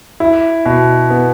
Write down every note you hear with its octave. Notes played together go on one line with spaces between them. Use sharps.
E4
B2
B3